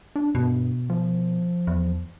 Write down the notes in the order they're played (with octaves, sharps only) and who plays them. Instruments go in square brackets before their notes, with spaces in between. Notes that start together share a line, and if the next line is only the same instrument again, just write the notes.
[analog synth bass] D4
[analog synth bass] G2 [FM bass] B2
[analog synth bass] F3
[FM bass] E2